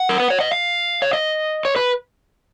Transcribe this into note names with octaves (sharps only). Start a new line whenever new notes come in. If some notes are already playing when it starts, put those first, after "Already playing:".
Already playing: F#5
A#4
B4
C#5
D#5
F5
C#5
D#5
C#5
B4